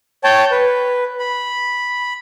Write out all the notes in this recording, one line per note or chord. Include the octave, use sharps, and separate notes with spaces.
C#5 G5 A5
B4
B5